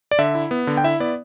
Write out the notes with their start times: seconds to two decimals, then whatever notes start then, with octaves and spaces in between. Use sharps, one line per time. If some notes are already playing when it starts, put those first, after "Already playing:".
0.11 D5
0.19 D3 E5
0.35 E4
0.51 B3
0.67 D3
0.77 G5
0.84 E4 E5
1.00 B3 D5